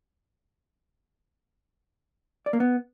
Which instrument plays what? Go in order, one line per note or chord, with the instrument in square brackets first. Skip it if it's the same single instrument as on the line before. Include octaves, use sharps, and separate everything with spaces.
[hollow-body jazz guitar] D5
A#3
B3